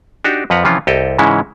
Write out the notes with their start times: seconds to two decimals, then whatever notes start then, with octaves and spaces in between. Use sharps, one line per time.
0.24 D4 D#4 F#4 G4
0.50 F2 F3 B4 F#5 A#5
0.64 C3 E3 F3 C#4 F4
0.87 C2 G4 A4 D#5
1.18 G#2 C#3 E3 G#3 C#4 E4